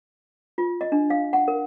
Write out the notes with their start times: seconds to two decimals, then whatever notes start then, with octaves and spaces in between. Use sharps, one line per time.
0.58 F4
0.81 D#5
0.92 D4
1.10 F5
1.33 F#5
1.48 A#4